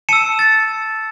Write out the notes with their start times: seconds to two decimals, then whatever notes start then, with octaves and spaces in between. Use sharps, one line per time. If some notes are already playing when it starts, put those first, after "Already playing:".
0.09 A5 E6 C#7 E7
0.39 A6